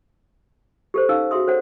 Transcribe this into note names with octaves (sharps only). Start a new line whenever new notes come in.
G4 A4 C5
C#4 D#4 A4 F5 E6
F#4 G#4 E5 C6 D#6
A4 C5 C#5 F#5